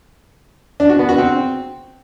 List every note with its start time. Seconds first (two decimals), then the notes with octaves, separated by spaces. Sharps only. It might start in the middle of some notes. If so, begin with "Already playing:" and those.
0.80 D4
0.89 F#4
0.99 B3
1.09 F#4
1.18 C4